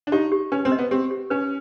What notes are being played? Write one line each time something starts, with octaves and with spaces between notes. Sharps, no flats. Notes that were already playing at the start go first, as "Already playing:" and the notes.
D4
D#4 G4
G4
C#4 B4
C4
D#5
B3
C4 G4
G4
C#4 B4